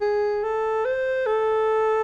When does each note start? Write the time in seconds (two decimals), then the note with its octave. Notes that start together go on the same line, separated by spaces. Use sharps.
0.01 G#4
0.43 A4
0.85 C5
1.26 A4